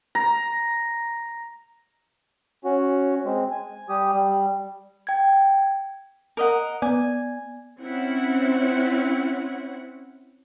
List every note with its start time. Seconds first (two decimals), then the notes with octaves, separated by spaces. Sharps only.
0.15 A#5
2.65 C#4 F#4
3.25 G#3 C4
3.51 G#5
3.89 G3 G4 D#6
4.14 G3
5.07 G5 G#6
6.37 A#4 D#5 F#5
6.82 B3 D5 G#5
7.81 C4 C#4 E4 F#5